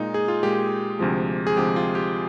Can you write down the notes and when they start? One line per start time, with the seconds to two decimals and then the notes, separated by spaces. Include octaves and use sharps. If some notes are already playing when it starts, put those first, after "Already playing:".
Already playing: A#2 G#3 D#4
0.14 G#4
0.28 F4
0.43 A#2 G#3 G4
0.99 D2 C3 F3 G#3
1.47 G#4
1.57 D2 C3 F3 G#3 G4
1.76 F4
1.95 G4